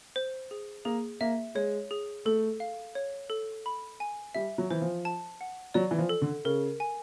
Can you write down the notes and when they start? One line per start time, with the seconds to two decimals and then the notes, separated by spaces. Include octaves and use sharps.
0.16 C5
0.51 G#4
0.85 A#3 G#4
1.21 A#3 E5
1.55 G#3 C#5
1.91 G#4
2.25 A3 A4
2.60 F5
2.95 C#5
3.30 A4
3.66 B5
4.00 G#5
4.35 G3 E5
4.58 F#3
4.70 E3 C5
4.82 F3
5.05 A5
5.41 F#5
5.74 F#3 D5
5.91 E3
5.98 F3
6.09 A4
6.22 D3
6.45 C#3 A#4
6.80 G#5